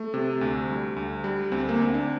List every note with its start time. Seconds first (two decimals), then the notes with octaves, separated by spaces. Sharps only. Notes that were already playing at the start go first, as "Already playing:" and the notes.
Already playing: A3
0.14 C3
0.41 D2
0.69 G3
0.96 D2
1.24 G3
1.52 D2 C4
1.69 A#3
1.80 D2 C4
1.94 D4